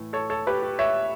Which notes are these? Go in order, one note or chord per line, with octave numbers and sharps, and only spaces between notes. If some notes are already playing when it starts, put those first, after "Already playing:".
Already playing: A2 E3 A3
A4 C#5
A4 C#5
G4 B4
G4
C#5 E5